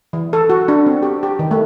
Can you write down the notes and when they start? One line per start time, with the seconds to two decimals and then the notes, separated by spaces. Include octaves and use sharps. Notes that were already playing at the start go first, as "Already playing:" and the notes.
0.13 E3
0.33 A4
0.50 F#4
0.68 D4
0.87 C4
1.03 G4
1.23 G4
1.39 D#3
1.51 A3